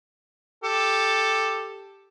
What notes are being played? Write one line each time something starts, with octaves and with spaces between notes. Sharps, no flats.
G4 A4